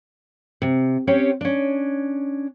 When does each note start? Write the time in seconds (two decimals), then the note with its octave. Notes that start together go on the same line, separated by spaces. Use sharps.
0.62 C3
1.07 C4 C#4 G4 C#5
1.41 C#4 D4